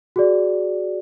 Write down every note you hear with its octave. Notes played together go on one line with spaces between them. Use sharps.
F#4 G#4 D5